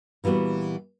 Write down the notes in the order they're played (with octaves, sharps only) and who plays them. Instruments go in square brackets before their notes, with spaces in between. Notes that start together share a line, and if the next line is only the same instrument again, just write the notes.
[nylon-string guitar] A#2 E3 G3 B3 F#4